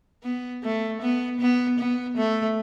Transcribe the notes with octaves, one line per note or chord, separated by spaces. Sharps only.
B3
A3
B3
B3
B3
A3